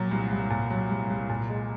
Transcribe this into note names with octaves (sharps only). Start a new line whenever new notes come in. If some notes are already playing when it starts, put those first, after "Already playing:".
Already playing: A#2 F#3
C2
C2
A#2
F#3
C2
C2
A#2
G#3